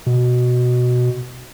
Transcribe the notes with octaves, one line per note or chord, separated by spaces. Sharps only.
B2